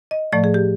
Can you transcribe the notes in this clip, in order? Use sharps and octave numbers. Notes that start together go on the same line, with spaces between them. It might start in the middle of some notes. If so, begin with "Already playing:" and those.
D#5
A2 F3 A3 D5
G#4
G4